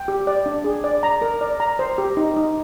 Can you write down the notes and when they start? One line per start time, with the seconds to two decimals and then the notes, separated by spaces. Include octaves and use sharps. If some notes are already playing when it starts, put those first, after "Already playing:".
Already playing: G5
0.08 G4
0.27 D5
0.46 D4
0.64 G#4
0.84 D5
1.03 A#5
1.22 A#4
1.41 D5
1.60 A#5
1.79 C5
1.98 G4
2.17 D#4
2.36 D#4